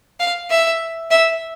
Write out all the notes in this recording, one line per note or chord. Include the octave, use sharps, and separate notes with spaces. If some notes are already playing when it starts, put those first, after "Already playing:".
F5
E5
E5